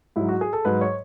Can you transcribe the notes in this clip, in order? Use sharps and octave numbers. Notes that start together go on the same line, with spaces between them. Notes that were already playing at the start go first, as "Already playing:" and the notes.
G#2 F#3 E4
F#4
G#4
A4
G#2 F#3 B4
C#5